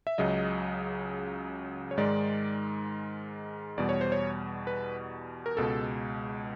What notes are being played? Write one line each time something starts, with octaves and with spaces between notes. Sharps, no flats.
E5
C#2 C#3 F#3 D#5
C#5
G#2 D#3 G#3 D5
E2 B2 G3 D5
C#5
C5
C#5
B4
A#4
C#2 B2 G#3 A4